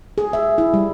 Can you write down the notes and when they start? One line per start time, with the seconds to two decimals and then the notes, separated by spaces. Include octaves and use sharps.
0.18 G#4
0.33 E5
0.58 E4
0.74 G3